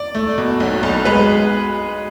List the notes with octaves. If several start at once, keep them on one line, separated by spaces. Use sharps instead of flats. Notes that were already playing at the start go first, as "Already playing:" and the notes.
Already playing: D5
A3
B2
B1
B1
G#3 B4